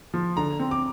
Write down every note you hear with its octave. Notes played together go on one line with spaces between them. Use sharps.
F3
D3 A#5
C4
D6